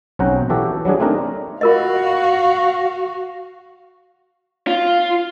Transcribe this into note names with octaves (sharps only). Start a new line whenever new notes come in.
B1 C4 C#4 F#5 G5 A#5
E3 F#4 G4 A4
F#3 G3 D4 G#4
A3 C4 D4 D#4 A#4
F4 F#4 A#4 D#5 F5
F4